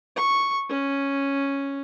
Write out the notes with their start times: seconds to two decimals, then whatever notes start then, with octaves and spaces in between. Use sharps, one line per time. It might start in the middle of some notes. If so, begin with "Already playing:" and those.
0.16 C#6
0.69 C#4